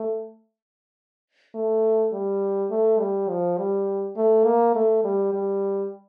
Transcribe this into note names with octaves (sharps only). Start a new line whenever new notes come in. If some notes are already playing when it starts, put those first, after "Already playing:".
Already playing: A3
A3
G3
A3
G3
F3
G3
A3
A#3
A3
G3
G3